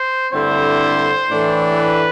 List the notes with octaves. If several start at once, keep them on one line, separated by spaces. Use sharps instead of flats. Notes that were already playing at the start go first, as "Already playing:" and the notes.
Already playing: C5
G2 D3 A3 C4 E4 C5
A2 E3 A3 D4
B4